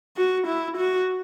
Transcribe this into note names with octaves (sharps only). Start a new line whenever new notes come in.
F#4
E4
F#4